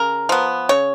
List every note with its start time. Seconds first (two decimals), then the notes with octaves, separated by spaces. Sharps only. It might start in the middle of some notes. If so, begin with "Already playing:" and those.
Already playing: C#3 A#4
0.29 F3 B3
0.69 C#3 C#5